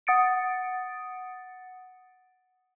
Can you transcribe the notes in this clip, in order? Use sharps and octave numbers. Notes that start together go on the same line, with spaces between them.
F#5 D#6 A6 C#7 D7